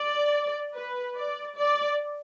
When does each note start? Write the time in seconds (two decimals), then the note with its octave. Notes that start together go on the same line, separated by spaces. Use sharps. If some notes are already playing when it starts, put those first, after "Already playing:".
Already playing: D5
0.75 B4
1.16 D5
1.56 D5